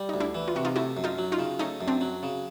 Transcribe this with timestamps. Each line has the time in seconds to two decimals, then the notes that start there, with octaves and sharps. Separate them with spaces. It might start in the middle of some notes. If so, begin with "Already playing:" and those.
Already playing: G3
0.09 D2 D#4
0.20 D4 E4
0.35 E3
0.48 F4
0.55 C3 F#4
0.65 D#4 F4
0.76 A3 E4 F#4
0.97 F#2
1.04 D#4 F4
1.18 F#3
1.32 D#4 F4
1.39 C#3
1.59 A3 C#4 D#4
1.81 F#2
1.88 C4 D4
2.01 F#3
2.23 C#3